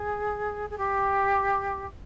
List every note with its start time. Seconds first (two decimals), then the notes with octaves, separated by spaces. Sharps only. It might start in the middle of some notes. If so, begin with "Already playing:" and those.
Already playing: G#4
0.70 G#4
0.78 G4